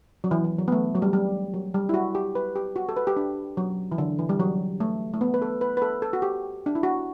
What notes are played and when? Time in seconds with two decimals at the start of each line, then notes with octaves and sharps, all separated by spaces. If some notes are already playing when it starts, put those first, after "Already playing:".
0.24 F#3
0.31 E3
0.44 E3
0.58 F#3
0.68 B3
0.72 A3
0.95 F#3
1.02 G3
1.13 G3
1.54 F#3
1.74 G3
1.89 E4
1.94 F#4
2.15 G4
2.35 B4
2.56 G4
2.76 F#4
2.89 A4
2.97 B4
3.07 G4
3.17 D4
3.57 F#3
3.92 E3
3.98 D3
4.19 E3
4.29 G3
4.40 F#3
4.80 A3
5.14 A3
5.21 B3
5.34 B4
5.42 A4
5.61 B4
5.77 B4
5.82 A4
6.02 A4
6.13 F#4
6.22 G4
6.66 D4
6.75 E4
6.83 F#4